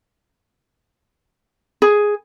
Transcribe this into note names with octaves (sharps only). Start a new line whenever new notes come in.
G#4